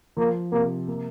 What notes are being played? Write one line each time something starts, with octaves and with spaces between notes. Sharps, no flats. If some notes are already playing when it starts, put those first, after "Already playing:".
F3 A#3
C3 A#3
A#3